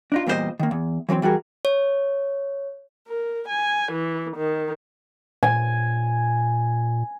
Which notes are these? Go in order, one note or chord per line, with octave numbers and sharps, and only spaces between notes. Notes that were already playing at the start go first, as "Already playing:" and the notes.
D4 D#4 F4
E2 A#2 G3 D#4 C5 D#5
D#3 A#3
E2
E3 F#3 A3 C4
E3 G3 F#4 G#4 A#4
C#5
A#4
G#5
E3
D#3
A#2 G#5